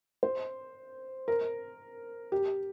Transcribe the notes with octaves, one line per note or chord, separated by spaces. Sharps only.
C5
A#4
G4